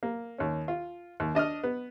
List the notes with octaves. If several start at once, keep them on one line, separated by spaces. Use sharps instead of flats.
A#3
D#2 C#4
F4
D#2
D4 D#5 D#6 F6
B3